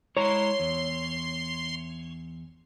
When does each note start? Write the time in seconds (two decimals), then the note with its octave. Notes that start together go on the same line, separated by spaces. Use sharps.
0.17 G#3 E4 C#5 A#5 C6
0.60 E2